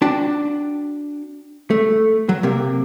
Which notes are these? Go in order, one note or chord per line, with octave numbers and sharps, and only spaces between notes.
D4 F#4 G5 A5
A3
F#3
C3 A#3